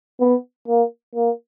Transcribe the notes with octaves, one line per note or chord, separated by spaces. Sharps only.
B3
A#3
A#3